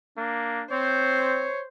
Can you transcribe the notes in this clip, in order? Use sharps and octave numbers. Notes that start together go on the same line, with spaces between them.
A#3 D4
C4 C5 C#5